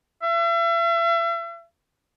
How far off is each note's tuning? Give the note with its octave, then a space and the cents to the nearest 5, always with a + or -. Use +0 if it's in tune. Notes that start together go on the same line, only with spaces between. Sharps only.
E5 +40